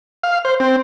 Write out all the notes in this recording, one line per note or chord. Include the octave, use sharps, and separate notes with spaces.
F5
C5
C4